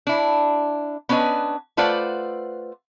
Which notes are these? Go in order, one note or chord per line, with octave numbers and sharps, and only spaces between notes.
D4 E4
B3 C#4 D4 B4 D#5
A3 F4 B4 C5 D5 F#5